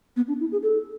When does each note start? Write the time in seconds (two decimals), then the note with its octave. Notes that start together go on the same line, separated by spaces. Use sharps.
0.16 B3
0.28 D4
0.40 E4
0.52 G#4
0.63 A4